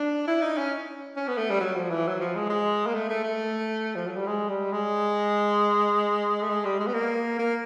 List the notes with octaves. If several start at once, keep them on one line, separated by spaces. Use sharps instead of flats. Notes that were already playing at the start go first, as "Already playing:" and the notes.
Already playing: D4
E4
D#4
C#4
C#4
B3
A3
G3
F#3
F3
E3
F#3
F3
G#3
G#3
A#3
A3
A3
A3
F3
F#3
G3
G#3
G3
G#3
A3
G#3
G3
G#3
B3
A#3
A#3